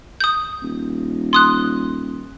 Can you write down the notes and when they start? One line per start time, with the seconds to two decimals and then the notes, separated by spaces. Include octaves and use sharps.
0.20 D#6 G6
0.62 D#1
1.33 C6 D#6 F#6